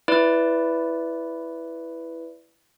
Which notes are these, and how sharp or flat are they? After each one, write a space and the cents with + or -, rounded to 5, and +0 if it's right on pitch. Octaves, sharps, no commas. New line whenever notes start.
E4 +5 B4 +5 D5 -15